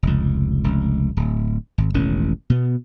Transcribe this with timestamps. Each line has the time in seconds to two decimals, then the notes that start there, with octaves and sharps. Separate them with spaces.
0.03 F1 C#2
0.64 F1 C#2
1.17 D1
1.78 G#1
1.94 E1 A1 D#3 C#4
2.50 B2 B3